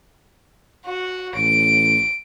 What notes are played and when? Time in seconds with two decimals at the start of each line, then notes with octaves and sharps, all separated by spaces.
0.85 F#4
1.35 A1 D7